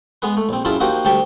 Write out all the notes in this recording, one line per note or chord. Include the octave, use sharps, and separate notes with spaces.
G#3 B3 G#4 B4
A3
A#1 C4
F#2 E4 F4 G#4 A5 B5
F3 A#3 D#4 F#4 G4 C5
D2 G3 G4 G5 A5 C#6